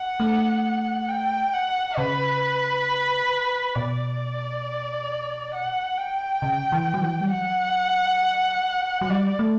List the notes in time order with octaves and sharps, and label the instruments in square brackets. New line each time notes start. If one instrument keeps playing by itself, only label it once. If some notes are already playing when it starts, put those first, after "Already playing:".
Already playing: [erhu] F#5
[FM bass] A3
[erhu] G5
F#5
[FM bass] C#3 [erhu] B4
[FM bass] B2 [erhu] D5
[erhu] F#5
G5
[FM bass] C#3
E3
F#3
E3
G3
[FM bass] F#3 [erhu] F#5
[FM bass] F#3
[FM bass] G3 [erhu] D5
[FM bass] A3